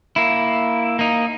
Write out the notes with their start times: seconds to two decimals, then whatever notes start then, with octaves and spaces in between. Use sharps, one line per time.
0.16 A#3 E4
0.99 A#3 D#4